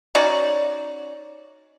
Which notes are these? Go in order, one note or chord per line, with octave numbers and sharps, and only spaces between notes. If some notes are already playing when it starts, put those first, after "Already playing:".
C#4 D#4 F#4 D5